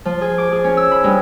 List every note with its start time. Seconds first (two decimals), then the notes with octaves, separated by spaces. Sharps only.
0.05 F3
0.21 G#4
0.38 D6
0.52 G#4
0.64 C#4
0.77 E6
0.91 B5
1.04 G2